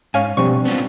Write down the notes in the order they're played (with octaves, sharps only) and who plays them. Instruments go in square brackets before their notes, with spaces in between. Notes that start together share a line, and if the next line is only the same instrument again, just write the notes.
[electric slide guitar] G#2 [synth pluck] C#4 F5 G#5
[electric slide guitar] B2 [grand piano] G3 C4 D4 [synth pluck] C#6
[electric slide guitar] B3 C#4 F4